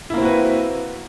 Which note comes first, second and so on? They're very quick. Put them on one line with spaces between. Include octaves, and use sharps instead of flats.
E4 A#3 C4 F#4 B4